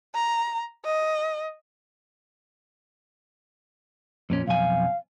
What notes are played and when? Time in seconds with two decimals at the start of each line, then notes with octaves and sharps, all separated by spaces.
0.15 A#5
0.85 D#5
4.30 F2 A#2 C#4
4.47 B1 F2 F5 G#5